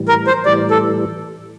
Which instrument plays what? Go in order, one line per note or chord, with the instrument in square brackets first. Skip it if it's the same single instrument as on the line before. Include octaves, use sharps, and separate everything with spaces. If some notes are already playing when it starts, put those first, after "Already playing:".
Already playing: [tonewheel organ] A2 E3 G3
[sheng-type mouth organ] A#4
C5
[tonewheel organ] A2 E3 G3 [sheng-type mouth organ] D5
[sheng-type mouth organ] A4